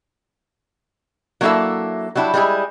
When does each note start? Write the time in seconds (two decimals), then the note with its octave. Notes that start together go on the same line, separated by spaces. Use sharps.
1.41 F#3 A#3 D4 E4 A4 E5
2.15 F#3 G3 D4 E4
2.34 G3 G#3 D4 E4 G#4